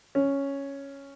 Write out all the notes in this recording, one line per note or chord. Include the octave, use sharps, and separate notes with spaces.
C#4